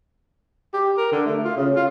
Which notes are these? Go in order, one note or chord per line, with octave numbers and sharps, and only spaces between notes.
G4
A#4
D3
A3
F4
C#3
F4